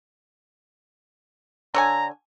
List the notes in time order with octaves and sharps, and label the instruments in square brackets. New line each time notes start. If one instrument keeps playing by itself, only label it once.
[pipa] D3 C#5 G#5 [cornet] A#5